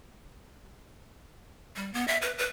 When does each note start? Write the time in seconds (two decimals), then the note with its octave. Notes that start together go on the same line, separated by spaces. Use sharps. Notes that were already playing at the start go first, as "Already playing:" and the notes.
1.76 G3
1.94 B3
2.08 E5
2.22 B4
2.38 B4